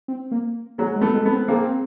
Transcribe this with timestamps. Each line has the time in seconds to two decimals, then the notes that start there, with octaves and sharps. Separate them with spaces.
0.08 C4
0.32 A#3
0.78 F#3 G#3 A#3
0.96 G#3
1.01 A3 B3
1.14 G#3
1.25 A3 B3
1.32 C4
1.48 G#3 A#3 C4